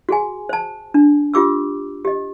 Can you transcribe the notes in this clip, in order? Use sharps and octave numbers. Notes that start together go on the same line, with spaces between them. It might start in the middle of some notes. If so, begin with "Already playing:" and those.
F#4 G#4 G#5
C5 A5
D4
F4 G4 D6 E6
G4 D#5